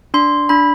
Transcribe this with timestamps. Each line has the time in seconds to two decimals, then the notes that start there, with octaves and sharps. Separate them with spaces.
0.14 D4 C6
0.49 D4 B5